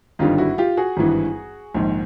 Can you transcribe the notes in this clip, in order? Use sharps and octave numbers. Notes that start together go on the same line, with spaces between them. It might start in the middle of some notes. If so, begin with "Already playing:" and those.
G#1 G2 D3 G3 D#4 F4
E4 F#4
F4 G4
F#4 G#4
G#1 G2 E3
A#1 G#2 D#3